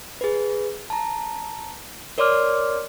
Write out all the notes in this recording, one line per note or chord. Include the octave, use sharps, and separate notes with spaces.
G#4 B4
A5 A#5
A#4 C#5 D5 C6 D6 F6